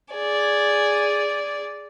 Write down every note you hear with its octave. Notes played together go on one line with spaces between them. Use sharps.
G#4 D5